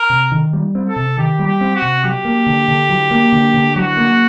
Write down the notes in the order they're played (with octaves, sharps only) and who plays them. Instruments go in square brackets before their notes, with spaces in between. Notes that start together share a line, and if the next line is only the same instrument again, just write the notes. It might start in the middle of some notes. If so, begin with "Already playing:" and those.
Already playing: [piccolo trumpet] A#4
[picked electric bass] C3
D#3
G3
C4
[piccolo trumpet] A4
[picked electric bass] C3
[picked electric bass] D#3 [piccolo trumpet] G4
[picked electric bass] G3
[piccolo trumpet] G4
[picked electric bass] C4
[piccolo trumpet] F#4
[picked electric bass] C3
[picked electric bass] F#3 [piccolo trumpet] G4
[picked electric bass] A#3
D3
D3
F#3
A#3
D3
D3
[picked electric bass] F#3 [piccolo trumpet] F#4
[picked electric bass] A#3